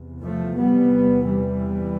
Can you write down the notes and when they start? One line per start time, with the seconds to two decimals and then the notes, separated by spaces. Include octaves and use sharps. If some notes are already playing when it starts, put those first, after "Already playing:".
Already playing: E2 C3
0.23 F3 A3
0.57 G3 B3
1.26 E3 G3